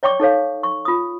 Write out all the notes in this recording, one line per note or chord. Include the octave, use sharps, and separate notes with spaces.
C#5 D5 G5 C#6 D6
D#4 A4 C#5 F5
C#6
F4 D#6